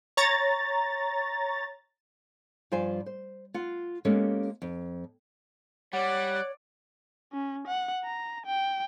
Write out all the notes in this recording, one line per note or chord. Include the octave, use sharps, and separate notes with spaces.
C#5 A#5 A6
G2 F3 F4 C5 G#5
C5
F4 F#5
G#3 A#3 B3 C#4 G4 A4
F2
G3 C#5 D5 F#5
C#4
F#5
A#5
G5